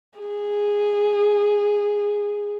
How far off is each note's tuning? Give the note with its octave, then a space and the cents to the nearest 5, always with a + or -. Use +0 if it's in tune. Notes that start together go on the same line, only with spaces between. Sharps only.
G#4 -10